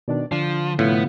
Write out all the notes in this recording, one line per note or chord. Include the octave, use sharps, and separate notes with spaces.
B2 D#3 D4 D5
D3 F3 D4
A2 C3 F3 B3 F4